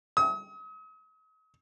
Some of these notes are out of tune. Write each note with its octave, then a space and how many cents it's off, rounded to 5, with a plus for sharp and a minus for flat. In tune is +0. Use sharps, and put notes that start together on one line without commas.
D#6 +40